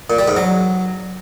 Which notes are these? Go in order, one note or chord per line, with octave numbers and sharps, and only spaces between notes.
A#2
G3
G#2
F#3